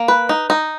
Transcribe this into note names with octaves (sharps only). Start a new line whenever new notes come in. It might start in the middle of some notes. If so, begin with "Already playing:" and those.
Already playing: A#3
B4
D#4
D#4